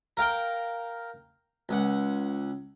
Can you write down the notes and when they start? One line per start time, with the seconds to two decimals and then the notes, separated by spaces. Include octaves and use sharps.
0.17 A#4 F5 G5
1.69 C#2 F#5